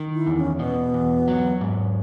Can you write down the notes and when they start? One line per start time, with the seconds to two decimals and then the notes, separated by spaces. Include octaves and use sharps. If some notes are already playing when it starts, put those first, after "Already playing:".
Already playing: D#3
0.14 E4
0.27 E2
0.37 C#4
0.59 B2 B3
0.94 E2
1.28 F#3
1.61 G#2